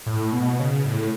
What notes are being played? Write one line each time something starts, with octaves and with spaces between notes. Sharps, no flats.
A2
B2
C#3
A2